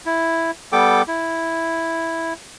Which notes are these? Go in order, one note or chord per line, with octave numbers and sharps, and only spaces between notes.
E4
G3 B3 A4 G5 D6
E4